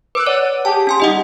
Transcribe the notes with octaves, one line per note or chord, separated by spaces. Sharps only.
B4 D6 E6 F#6
C#5 D5 F#5 D#7
G4 G#4 A5
C#4 G#5 C6
G3 D#4 G4 D#5 F#5